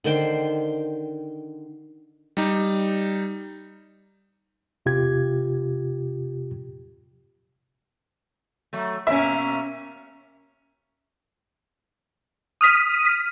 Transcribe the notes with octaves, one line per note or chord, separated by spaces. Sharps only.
D3 D#3 C5 G5
G3 D#4
E2 C3 F4 G4 G#6
F#3 A3
B2 A#3 C#4 E5
D#6 F6 B6 D#7